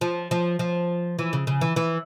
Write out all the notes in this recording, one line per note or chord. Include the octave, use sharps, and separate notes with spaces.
F3
F3
F3
E3
C#3
C#3
E3
E3